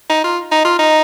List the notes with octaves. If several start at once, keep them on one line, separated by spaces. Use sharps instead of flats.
D#4
F4
D#4
F4
D#4